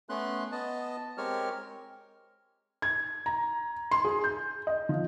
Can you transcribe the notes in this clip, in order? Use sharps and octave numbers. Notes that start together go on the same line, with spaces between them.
A3 B3 C#4 C6 F#6
B3 D#5 A5
G#3 C4 G4 A#4 C#5 F6
G#6
A#5
C6
G#4
G6
D#5
F3